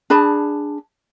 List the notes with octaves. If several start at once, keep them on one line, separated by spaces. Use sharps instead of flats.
D4 G#4 A5 B5